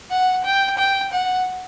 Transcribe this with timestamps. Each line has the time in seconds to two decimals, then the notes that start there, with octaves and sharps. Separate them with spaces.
0.10 F#5
0.45 G5
0.78 G5
1.12 F#5